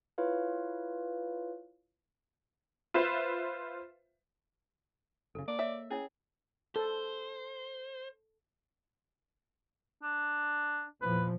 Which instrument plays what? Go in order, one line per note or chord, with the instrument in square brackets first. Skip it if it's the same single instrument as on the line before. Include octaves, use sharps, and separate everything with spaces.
[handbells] E4 F4 B4 C#5 F5
[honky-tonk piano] F4 B4 C5 E5
[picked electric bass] F#1 C#3 [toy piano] A4
[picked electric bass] A#3 [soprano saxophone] D5
[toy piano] C#5 D#5 D6 [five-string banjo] E5
[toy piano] C#4 E4 C#5 [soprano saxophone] G#4
[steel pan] A4 [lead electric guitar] C5
[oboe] D4
[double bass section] E2 A#2 F3 [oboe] B4